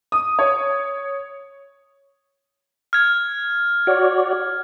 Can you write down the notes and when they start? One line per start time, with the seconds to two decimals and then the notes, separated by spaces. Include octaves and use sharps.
0.12 D#6
0.39 C#5
2.93 F6 G#6
3.87 F#4 C#5 D5